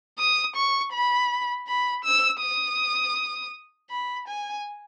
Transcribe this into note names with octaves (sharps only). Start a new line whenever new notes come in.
D#6
C#6
B5
B5
E6
D#6
B5
G#5